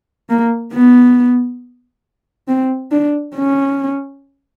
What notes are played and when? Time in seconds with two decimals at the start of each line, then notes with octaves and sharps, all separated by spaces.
0.29 A#3
0.73 B3
2.48 C4
2.92 D4
3.36 C#4